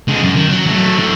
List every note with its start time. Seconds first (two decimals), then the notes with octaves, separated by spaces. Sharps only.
0.08 D3 G#3
0.23 F#2
0.36 D#3
0.50 F#3
0.66 F#3 A3
0.97 A2 D3